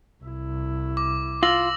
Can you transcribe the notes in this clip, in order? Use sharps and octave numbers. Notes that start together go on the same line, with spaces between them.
C2 E4
D6
F4 E6 A#6 F#7